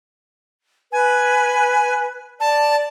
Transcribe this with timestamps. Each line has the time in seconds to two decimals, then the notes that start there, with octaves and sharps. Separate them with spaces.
0.92 B4 G#5
2.40 D5 A5